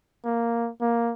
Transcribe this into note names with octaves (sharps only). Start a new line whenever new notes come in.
A#3
A#3